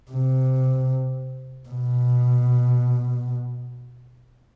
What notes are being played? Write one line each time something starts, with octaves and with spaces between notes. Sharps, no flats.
C3
B2